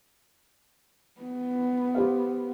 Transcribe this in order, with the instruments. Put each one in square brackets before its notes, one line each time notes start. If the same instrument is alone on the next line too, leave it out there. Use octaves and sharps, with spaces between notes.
[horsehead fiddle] B3
[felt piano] G4 C5 F5